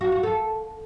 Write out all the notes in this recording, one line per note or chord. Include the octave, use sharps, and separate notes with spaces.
F#4
F#4
A4